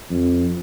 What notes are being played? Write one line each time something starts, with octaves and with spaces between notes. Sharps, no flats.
F2